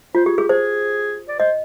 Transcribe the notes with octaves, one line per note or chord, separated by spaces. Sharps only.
F4 C5
G4 G#4
G4 G#4
G#4 C5
D5
C5 D#5